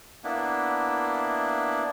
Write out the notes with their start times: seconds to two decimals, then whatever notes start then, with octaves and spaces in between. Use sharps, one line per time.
0.24 A#3 B3 D4 E4